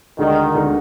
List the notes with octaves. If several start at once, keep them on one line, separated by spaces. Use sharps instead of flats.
D2 D3 D#3 G#3 D#4
D2 D3 G#3 D#4